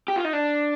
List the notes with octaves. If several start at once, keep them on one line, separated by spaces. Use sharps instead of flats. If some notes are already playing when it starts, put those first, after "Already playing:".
G4
F4
D#4
D4